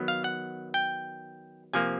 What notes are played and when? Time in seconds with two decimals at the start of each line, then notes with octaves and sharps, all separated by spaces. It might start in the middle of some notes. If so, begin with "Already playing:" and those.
Already playing: D#3 F#3 B3
0.08 F5
0.24 F#5
0.74 G5
1.73 C3 F3 A#3 G#5